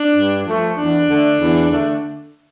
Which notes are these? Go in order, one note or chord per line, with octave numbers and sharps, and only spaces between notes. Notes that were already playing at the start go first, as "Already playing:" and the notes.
Already playing: D4
G2
F3 A3
E2 D4
D3 A3
E2
D3 A3